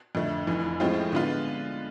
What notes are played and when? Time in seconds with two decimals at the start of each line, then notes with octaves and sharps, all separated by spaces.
0.15 F2 D3 A3
0.47 F1 F2 E3
0.80 A2 F3 G#3 C4 F4
1.12 D3 G#3 B3 F4